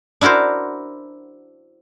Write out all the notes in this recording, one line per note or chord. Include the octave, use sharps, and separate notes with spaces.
D4 E4 F#4 A#4 C5